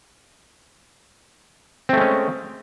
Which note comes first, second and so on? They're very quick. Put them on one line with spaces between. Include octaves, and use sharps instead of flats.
C4 A3 G#3 C#4